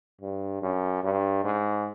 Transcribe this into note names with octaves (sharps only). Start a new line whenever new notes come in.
G2
F#2
G2
G#2